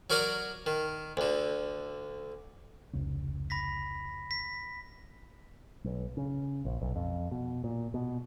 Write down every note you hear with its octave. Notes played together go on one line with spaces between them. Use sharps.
F#3 F#4 A#4 D5 D6 D#6
D#3
D2 D3
F1 C#2 C#4
B5 A#6 B6
B6
B1
C#3
A#1
B1
F2
B2
A#2
B2